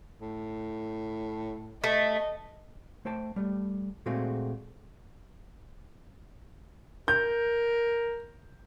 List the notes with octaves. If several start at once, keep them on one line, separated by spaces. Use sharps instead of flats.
A2
A3 D#5
A3 C5 G5 A5
G3 A3
A#2 G#3 A3 C4 F#4 G#4
A#4 G6